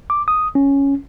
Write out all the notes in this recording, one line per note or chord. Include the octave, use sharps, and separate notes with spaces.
D6
D#6
C#4